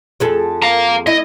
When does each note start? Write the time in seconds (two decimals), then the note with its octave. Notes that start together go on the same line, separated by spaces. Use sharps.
0.20 F2 G#4 A4
0.62 F5 A#5
1.07 E4 D#5